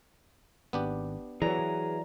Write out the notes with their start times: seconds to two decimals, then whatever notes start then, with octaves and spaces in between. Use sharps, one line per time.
0.73 G#1 B3 D4 G4
1.42 E3 F#3 G#4 B4 D5 A#5